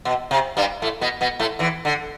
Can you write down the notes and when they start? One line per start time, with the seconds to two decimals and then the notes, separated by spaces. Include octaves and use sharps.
0.05 B2
0.31 C3
0.57 G2 G3
0.82 A2 A3
1.01 B2 B3
1.21 B2 B3
1.40 A2 A3
1.59 E2 E3
1.85 D3